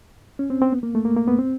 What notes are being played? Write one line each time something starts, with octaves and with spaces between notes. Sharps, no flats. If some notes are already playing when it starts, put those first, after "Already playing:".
C#4
C4
C4
B3
A#3
A3
A#3
A#3
B3
C4